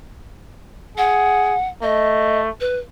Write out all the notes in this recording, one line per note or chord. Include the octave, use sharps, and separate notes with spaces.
G#4 F#5
A3 D#5
B4